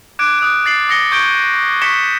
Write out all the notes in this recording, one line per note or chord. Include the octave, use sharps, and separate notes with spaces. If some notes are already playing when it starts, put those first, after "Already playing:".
D6 F#6 G#6 D7
D#6 F#6
A6 C7 F#7
D#6 A#6 C#7 G7
C#6 G6 G#6 D7 G7
C#6 G#6 B6 C#7 E7 G7